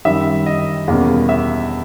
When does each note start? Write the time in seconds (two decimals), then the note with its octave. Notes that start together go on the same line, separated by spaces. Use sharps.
0.05 F#2 D#3 G3 E5
0.46 D#5
0.88 E2 B2 G3 A#3 C#4 F5
1.29 E5